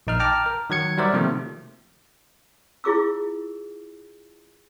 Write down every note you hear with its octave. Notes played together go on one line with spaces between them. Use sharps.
A#1 D#4 F6
G5 A5 A#5 D6 F6
A#4
D#3 F#3 G#6 C#7
F#3 G3 A#4 C5 D5 E5
C3 D#3 F3 A3 A#3
E4 F4 G#4 D6 E6